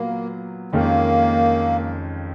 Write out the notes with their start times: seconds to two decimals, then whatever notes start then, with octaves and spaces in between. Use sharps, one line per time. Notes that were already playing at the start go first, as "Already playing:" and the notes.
Already playing: A#2 F#3 A#3 B3
0.72 F2 D#3 G#3 A#3 C#4